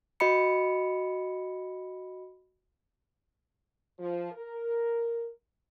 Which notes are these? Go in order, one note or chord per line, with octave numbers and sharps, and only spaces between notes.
F#4 D#5 B5 C#7
F3
A#4